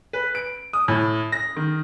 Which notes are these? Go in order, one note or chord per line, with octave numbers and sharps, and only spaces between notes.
B4
D7
D#6
A2
A#6
D#3